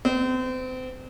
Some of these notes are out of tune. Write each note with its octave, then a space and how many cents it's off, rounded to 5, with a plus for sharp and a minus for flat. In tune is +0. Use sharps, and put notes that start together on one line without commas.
C4 -35